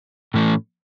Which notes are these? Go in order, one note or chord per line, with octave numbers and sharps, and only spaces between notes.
A2 E3 A3 C#4